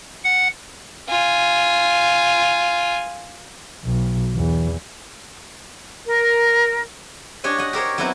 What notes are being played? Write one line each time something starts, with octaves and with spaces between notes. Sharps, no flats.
F#5
F4 G#5
B1
E2
A#4
D4 G4 C#5 D#5 G#5
D#5 F#5
G4 A#4 C5 C#5
F#3 B3 C4 E4 B4